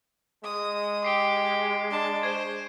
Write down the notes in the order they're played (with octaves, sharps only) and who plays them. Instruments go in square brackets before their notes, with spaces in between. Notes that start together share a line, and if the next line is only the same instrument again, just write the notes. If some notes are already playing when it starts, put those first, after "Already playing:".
[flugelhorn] G#3 [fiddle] D#6
[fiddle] G4 [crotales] C7 D7 G7
[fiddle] D4 A5
[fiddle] C5 [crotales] C#6 G#6 C7